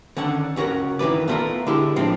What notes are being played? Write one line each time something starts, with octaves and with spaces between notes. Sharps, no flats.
D3 D#3 C#4 F#5
C#2 C#4 F#4 A#4 F#5
D#3 E3 A3 B4 D5
A3 B3 E4 F4 A#4
D3 G#3 E4 G4
A2 F3 C4 D4